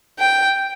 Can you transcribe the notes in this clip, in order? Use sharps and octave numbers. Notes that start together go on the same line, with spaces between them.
G5